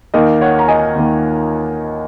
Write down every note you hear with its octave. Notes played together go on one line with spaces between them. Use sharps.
D#2 D#3 A#3 A#4 D#5
C#5 F#5
A#5
D#5 G#5
D#2 D#3 A#3